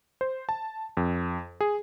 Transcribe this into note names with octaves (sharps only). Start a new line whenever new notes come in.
C5
A5
F2
G#4